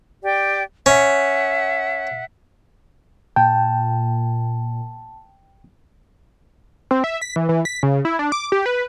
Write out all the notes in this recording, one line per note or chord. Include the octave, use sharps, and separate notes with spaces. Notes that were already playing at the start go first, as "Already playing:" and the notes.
G4 D5 G5
C#4 E5 F#5
A#2 G5 A5
C4
E5
B6
E3
E3
B6
C#3
E4
D4
D6
G4
B4